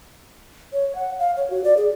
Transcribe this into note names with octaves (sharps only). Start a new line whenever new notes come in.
C#5
F#5
F5
C#5
F#4
D5
G#4